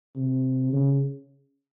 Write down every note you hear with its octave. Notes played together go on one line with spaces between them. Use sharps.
C3
C#3